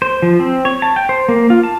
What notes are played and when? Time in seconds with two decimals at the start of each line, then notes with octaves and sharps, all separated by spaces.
0.02 C5
0.22 F3
0.40 C4
0.65 C#5
0.82 A5
0.96 G5
1.09 C5
1.29 A#3
1.50 F4
1.63 A5